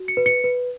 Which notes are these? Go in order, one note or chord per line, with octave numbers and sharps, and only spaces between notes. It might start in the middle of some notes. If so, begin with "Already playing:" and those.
Already playing: F#4
C#7
B4
C#7
B4